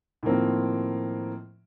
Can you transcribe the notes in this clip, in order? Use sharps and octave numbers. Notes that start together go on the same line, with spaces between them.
A2 D#3 F3 A#3 C4